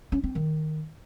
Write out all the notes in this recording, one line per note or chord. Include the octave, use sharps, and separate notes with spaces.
C#4
C4
D#3